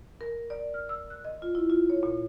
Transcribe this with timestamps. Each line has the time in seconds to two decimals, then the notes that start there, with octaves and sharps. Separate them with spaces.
0.21 A#4
0.50 D5
0.74 F6
0.89 E6
1.10 F#6
1.25 D#5
1.42 F4
1.55 E4
1.70 F4
1.90 C#5
2.03 A#2